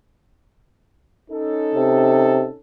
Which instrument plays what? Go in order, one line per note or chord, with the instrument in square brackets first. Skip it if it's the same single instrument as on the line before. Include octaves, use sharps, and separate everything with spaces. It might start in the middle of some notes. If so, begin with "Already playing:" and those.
[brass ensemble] C#4 D#4 A4
[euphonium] C3